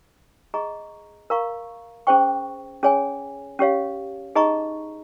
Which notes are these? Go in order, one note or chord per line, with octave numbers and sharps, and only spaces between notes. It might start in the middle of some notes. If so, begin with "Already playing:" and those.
G#4 D#5 A#5 C#6
A#4 F5 A#5 C#6
C#4 G#4 C5 G5 C#6
C#4 G#4 C#5 G#5
C#4 G4 C#5 F5
D#4 G#4 D#5 A#5 C#6